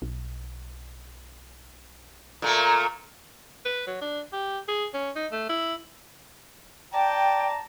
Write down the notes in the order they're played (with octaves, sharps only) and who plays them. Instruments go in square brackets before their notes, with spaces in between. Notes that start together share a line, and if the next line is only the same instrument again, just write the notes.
[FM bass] B1
[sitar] A#2 A3 A#3
[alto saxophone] B4
F#3
D4
G4
G#4
C#4
D#4
A3
E4
[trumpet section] D5 A#5 [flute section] G5 [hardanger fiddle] A5